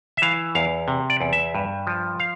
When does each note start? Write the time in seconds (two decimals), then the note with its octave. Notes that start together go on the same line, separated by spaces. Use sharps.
0.17 E5
0.22 E3 F5
0.55 E2 F5
0.88 C3
1.10 D5
1.21 E2
1.33 E5
1.55 G2
1.87 F3
2.20 F5